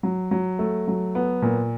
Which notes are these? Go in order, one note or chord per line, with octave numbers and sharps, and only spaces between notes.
F#3
F#3
A3
F#3
B3
A#2